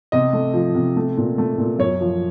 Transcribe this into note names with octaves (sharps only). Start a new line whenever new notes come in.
C3 D#5
A3
F3
C3
A3
A#2
A3
A#2
F#2 C#5
F3